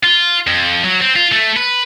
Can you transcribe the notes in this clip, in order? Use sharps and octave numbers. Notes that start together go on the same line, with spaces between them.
F4
F2
F#3
C4
F4
A3
B4